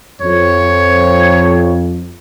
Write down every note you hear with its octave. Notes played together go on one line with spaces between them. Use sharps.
F2 C#5